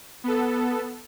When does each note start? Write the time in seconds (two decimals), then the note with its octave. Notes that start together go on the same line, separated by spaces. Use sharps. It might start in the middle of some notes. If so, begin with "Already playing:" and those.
0.24 B3 A4